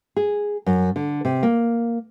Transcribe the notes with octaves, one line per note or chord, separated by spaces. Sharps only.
G#4
F#2
D3
C3
A#3